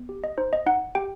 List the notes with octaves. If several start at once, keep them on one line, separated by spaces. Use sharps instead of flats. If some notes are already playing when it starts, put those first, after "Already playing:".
Already playing: B3
G4
D#5
D#4 C5
D#5
D#4 F#5
G4 G5